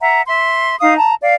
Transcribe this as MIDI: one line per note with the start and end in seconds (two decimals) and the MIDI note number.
0.01 0.21 76
0.01 0.21 78
0.01 0.21 82
0.26 0.77 76
0.26 0.77 84
0.81 0.97 63
0.81 0.97 77
0.81 0.97 87
0.97 1.15 81
0.97 1.15 82
1.22 1.35 74
1.22 1.35 77